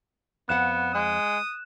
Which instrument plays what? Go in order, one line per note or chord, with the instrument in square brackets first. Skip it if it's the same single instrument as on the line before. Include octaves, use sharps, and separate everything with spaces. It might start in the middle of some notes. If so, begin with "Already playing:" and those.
[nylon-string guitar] F2 F5 F#5 [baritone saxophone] B3 [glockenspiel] F#6 E7
[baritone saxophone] G#3 [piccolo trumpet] D#6